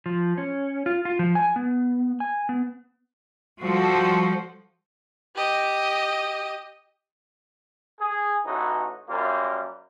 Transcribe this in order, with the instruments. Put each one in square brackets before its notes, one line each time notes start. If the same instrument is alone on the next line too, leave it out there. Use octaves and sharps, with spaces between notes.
[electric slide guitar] F3
C#4
F4
F4
F3
G#5
B3
G#5
B3
[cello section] F3 G3 F4 F#4 A4 C5
[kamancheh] G4 D#5
[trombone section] G#4
A1 E3 D#4 F#4
F#2 G3 A#3 F4